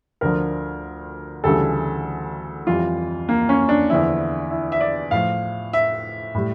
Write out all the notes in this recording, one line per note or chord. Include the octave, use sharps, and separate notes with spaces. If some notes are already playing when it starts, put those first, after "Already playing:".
D2 D3 F3 A#4
D2 C#3 E3 G3 A4
F2 E3 G3 F4
A#3
C#4
D4
E2 D3 F3 E4
E4
E5
D5
A2 F3 F5
E5
A2 G3